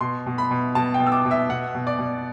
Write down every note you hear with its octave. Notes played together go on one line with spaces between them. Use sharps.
B2 C6
B2
B5
B2
B2 A5
G5
B2
E6
D6
B2
E5
B2 F#5
B2
D5
B2